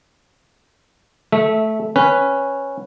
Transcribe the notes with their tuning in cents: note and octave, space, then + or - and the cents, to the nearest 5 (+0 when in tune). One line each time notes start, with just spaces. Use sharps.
A3 -10 E5 -20
C#4 -10 B4 +0